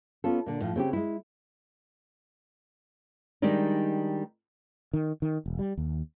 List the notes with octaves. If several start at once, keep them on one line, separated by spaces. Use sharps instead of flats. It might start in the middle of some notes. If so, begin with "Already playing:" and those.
B3 C#4 F4 A4
A#2 D3
A2 F3
C#3 C4 C#4 G4
G#3 E4
D#3 G3 G#3 D4 D#4
D#3
D#3
E1
G3
D#2